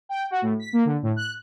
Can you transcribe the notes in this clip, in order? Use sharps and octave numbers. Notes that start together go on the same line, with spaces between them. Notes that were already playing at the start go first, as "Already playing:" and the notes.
G5
F#4
A2
B6
A#3
D3
A2
F#6